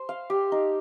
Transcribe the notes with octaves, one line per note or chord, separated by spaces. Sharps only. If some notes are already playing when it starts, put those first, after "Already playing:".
Already playing: C5
F5
G4
D#4